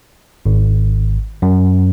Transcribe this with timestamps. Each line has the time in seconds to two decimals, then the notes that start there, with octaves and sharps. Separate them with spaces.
0.46 G#1
1.42 F#2